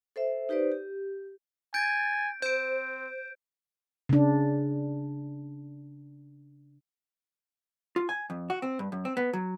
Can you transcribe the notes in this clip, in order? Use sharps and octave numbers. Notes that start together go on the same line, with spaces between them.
A4 C5 E5
D#4 G4 B4 C5 D5
G4
G#5 G6 A6 D7
C4 C5 G6 D7
C#3 D4
F4
G#5
F2
F#4
C4
G2
F#2
C4
B3
F#3